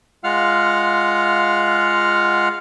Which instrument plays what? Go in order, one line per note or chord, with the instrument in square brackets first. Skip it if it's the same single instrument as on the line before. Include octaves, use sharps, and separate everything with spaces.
[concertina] G#3 F4 F5 F#5 F6